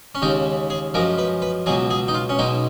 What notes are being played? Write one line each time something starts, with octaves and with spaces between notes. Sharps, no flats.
C#4
D#2 C#3 G#3 D#4
G#4
F#2 F3 G#3 A#4
B4
B4
C#2 B2 F#3 G#4
G#4
D#4
F4
C#4
B1 B2 G#3 D#4